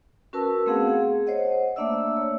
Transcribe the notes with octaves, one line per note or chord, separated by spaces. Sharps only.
C#4 F#4 A#4 B4 A5 E6
A3 B3 C4 G#4 F5 F#5
G#4
C5 C#5 D#5 F#5
A3 A#3 D4 D5 E5 E6
C#5